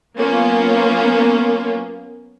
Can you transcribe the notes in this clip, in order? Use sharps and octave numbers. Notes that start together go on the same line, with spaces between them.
F#3 A#3 B3 C#4 F4